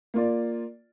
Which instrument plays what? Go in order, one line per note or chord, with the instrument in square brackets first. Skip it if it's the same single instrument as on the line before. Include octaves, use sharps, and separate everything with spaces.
[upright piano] A#3 F4 D5